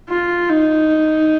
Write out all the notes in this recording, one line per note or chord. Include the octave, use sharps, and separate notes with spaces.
F4
D#4